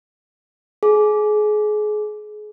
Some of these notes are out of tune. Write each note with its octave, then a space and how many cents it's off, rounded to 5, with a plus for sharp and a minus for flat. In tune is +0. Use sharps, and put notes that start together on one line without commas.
G#4 +30